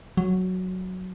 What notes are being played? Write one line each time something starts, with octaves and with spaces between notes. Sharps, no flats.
F#3